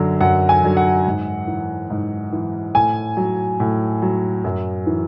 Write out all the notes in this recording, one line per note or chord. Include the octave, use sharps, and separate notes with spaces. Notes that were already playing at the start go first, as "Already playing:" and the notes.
Already playing: F#2 D3 F#3
F#2 F#5
G#5
D3 F#3
F#5
G#2
E3
G#2
E3
A2 G#5
F#3
A2
F#3
F#2
E3